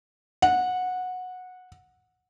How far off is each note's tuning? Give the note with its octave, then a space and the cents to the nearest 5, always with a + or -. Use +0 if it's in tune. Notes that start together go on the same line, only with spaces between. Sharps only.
F#5 -15